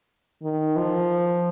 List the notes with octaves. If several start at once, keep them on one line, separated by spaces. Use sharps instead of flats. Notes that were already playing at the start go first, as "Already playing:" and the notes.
D#3
F3